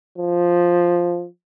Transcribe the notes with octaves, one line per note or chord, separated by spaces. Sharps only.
F3